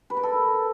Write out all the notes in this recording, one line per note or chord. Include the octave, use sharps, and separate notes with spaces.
B4
A#4
A4